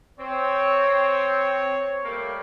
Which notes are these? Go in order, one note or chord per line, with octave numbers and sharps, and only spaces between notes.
C4 C#5
G3 A3 A#3